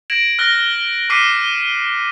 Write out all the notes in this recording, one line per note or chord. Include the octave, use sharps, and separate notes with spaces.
G#6 A#6 D7 E7 F#7
F6 F#6 A#6 G7
C#6 D6 F6 B6 C7 D#7